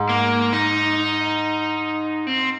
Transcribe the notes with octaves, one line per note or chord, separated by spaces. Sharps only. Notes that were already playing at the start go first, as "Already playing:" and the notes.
Already playing: G#2
A#3
D#4
C4